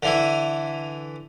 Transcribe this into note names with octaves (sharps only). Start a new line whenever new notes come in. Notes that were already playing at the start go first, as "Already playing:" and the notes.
D3 E3 E4